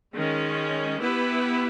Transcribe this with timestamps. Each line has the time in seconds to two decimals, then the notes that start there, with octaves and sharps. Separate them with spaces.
0.15 D#3 G#3 C#4
1.00 B3 E4 G4 B4